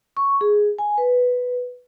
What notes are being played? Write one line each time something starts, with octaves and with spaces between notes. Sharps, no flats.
C#6
G#4
G#5
B4